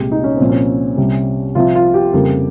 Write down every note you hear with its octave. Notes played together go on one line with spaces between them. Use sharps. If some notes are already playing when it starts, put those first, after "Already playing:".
Already playing: C2 A#2 G#3 G4
D#4
C#4
C2 A#2 F3 C4
C#4
C2 C3 G3
C2 C3 F3 F4
F4
G4
F2 C#3 G3 A#3